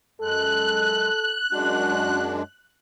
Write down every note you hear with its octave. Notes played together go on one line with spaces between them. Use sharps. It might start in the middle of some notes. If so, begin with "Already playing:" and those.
F#2 G#3 A4 F#6
F#2 G#3 D4 F#4